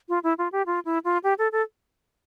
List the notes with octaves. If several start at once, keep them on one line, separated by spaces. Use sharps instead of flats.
F4
E4
F4
G4
F4
E4
F4
G4
A4
A4